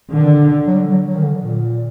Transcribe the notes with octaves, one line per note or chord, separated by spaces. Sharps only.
D3 D#3
F#3
G3
F#3
F#3
D#3
D3
A#2